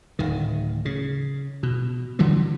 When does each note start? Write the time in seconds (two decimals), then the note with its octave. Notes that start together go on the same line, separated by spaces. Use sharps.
0.19 D1 D#3
0.85 C#3
1.63 B2
2.19 D3 E3 F#3 G3